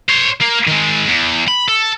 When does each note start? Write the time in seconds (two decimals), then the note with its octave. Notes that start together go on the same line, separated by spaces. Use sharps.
0.09 C5 C#5
0.41 A#3
0.67 D#3 G#3
1.08 E2
1.48 B5
1.69 A4